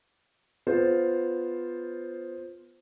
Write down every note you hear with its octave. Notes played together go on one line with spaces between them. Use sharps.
B3 F4 C5